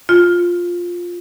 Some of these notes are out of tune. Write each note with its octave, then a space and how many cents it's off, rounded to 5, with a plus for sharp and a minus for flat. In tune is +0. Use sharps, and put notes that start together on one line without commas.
F4 +5